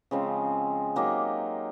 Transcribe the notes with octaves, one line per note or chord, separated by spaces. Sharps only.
C#3 F3 G#3 C4
F#3 A#3 D#4 G4